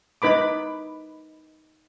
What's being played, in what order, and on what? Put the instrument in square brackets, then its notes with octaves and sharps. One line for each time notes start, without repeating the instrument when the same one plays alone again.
[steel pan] D#4 B4 B5 D6